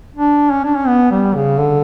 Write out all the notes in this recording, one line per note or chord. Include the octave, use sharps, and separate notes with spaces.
D4
C#4
D4
C#4
B3
G3
C#3
D3